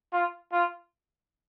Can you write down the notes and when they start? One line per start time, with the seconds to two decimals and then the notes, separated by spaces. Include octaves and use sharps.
0.13 F4
0.52 F4